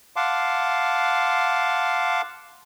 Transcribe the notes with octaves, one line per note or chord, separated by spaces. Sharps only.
F5 F#5 A5 C6 D6